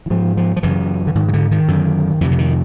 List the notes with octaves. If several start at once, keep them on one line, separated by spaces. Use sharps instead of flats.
E3
G#2 F3
F3
F3
F#2 C#3 E3
D3
G#2 D#3
D#3
D3
D#3
F#2 D3
F2 C3 E3
D3
D#3